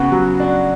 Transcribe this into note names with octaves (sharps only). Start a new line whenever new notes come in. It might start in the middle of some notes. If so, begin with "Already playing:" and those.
Already playing: C#3 B3 F#4
F#3
D4